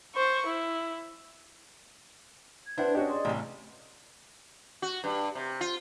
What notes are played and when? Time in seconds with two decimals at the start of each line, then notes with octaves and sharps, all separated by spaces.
0.15 C5 C#6
0.46 E4
2.66 G#6
2.78 D4 E4 B4 C5 F#5
2.95 C#4 F#4 G4 D#5
3.09 G#4 D5 C6
3.25 A1 C3 G3
4.82 F#4
5.04 G2
5.35 C3
5.61 F4